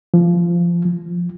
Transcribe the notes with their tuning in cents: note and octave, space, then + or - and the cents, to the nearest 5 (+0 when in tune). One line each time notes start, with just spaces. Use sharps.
F3 -20
F3 +0